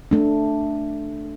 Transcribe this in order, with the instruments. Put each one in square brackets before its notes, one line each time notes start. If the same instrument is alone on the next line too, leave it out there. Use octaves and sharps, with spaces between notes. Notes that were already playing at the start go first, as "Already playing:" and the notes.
[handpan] A3 D4